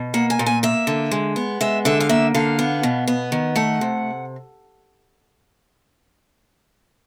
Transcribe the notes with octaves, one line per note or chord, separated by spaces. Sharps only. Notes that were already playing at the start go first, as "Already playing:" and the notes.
Already playing: B2
A#3 F#5
G#5
A#2
G#5
A#3 E5
D3
G#3
B3
G#3 E5
D3 E5
F5
A#3 E5
D3 F5
B3
B2
B3
D#3
A3 F#5
C3